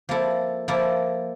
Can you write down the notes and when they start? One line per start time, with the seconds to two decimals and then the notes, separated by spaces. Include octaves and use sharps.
0.09 F3 A#3 E4 A4
0.68 F3 A#3 E4 A4